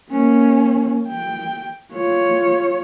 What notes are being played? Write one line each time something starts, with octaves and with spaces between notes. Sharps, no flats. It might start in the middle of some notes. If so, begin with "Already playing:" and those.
A#3 C#4
G5
F4 C#5